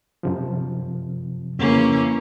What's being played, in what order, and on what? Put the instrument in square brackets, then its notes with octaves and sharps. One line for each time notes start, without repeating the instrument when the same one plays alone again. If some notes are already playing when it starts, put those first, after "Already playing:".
[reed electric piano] F#2 C3 F3
[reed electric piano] F2 C#3 [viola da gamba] E3 A#3 C#4